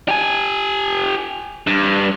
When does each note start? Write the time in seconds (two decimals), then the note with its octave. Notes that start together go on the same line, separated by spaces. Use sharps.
0.09 G4 G#5
1.67 G2